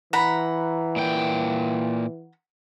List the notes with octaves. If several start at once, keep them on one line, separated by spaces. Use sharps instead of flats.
E3 F#5 A#5 B5
A#2 G5